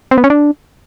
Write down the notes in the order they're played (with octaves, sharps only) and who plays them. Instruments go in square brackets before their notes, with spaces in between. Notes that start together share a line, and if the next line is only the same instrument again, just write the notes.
[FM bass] C4
B3
C#4
D4